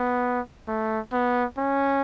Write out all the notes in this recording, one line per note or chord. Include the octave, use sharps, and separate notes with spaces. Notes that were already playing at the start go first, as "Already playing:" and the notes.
Already playing: B3
A3
B3
C#4